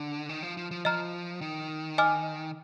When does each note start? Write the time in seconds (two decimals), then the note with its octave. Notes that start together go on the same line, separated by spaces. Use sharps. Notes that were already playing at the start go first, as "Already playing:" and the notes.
Already playing: D3
0.29 D#3
0.43 F3
0.57 F3
0.71 F3
0.85 F3 D#5 A#5 F6
1.41 D#3
1.98 D#5 G#5 D6 F6